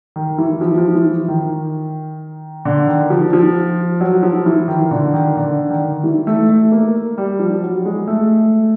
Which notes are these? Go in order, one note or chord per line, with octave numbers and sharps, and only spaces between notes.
D#3
E3
F3
F3
E3
D#3
D3
D#3
F3
F3
F#3
F3
E3
D#3
D3
D#3
D3
D#3
E3
A3
A3
A#3
G3
F3
F#3
G#3
A3